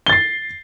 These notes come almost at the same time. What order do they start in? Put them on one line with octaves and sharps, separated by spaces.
G7 A6 C7